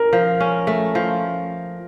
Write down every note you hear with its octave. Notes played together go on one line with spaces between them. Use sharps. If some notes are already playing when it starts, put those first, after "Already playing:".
Already playing: C#4 A#4
F3
C#4
A3
F3